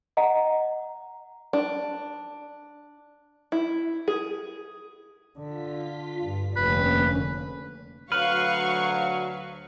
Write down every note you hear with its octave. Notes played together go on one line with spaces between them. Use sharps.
D#5 F#5 A#5
D4
E4
G#4
D3 F4 B6
G2
F1 D3 A#3 C#4 B4
D2 F#3 B4 F5 C#6 F6